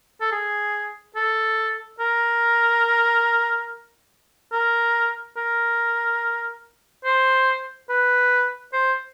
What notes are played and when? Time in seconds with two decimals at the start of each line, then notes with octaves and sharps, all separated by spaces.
0.21 A4
0.32 G#4
1.16 A4
2.00 A#4
4.52 A#4
5.37 A#4
7.05 C5
7.89 B4
8.73 C5